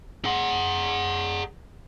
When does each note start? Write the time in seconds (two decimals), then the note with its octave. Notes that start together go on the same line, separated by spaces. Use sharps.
0.25 G#4 F#5